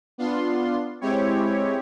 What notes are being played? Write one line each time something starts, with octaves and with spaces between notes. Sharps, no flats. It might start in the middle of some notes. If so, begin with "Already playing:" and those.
B3 D4 F4 C6
G#3 C4 E4 G4 C#5